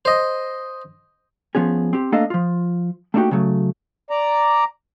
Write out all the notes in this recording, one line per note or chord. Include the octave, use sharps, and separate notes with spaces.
C5 D#5
F3 B3 C#4 G#4
C4 G4
A3 A#3 D4 A4 D#5 F5
F3 F4
A3 A#3 D4 D#4 F#4 G4
C#3 F#3 A3
D5 A#5